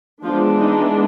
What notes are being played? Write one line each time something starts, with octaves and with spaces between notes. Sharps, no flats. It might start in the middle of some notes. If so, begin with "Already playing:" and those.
E3 F3 G#3 B3 D4 F4
D#4